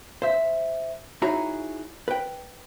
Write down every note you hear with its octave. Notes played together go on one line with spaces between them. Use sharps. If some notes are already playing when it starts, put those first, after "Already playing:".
C5 E5
D#4 E4 F#4 G#4 C#5 A#5
B4 G5